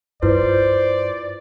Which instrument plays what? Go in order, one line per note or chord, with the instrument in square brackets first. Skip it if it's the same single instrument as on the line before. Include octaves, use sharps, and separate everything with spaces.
[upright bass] G2 [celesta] E4 F4 B4 [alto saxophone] C5 [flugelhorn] D5